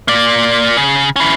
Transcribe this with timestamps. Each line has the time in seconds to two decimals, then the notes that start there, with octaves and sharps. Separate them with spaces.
0.08 A#3 D5
0.77 C#3
1.16 C#4 E4